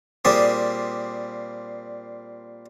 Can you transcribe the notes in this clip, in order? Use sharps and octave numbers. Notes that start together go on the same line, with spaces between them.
A#2 G3 C4 G#4 D5 C6